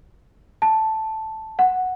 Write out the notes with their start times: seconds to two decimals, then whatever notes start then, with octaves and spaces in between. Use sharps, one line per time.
0.62 A5
1.59 F#5